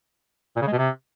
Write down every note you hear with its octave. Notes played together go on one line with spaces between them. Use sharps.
A#2
C#3
G#3
B2
C3